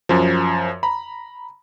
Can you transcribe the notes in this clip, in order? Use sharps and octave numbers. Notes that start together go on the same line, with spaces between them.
F#2 F3
A#5 B5